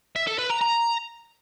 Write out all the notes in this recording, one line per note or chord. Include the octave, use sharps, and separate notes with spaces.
E5
A4
B4
A#5
A#5